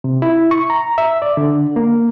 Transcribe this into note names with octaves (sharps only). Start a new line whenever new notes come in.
C3
E4
C#6
A#5
E5
D5
D3
A#3